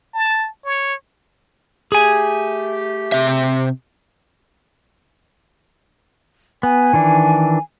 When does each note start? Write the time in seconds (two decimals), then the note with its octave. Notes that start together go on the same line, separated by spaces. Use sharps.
0.14 A5
0.65 C#5
1.92 A3 G4 G#4 G#5
3.12 C3 E5
6.63 B3 G#5
6.93 D#3 E3 D4